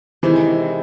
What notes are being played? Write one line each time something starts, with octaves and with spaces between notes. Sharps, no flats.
C3 D#3 E3 G#3